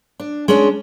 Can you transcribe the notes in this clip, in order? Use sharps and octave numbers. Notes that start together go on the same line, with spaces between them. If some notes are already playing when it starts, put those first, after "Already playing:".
D4
G#3 C#4 D4